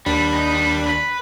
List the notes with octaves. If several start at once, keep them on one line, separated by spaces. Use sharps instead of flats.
D#2 G3 D4 B5
D#4
G3
B4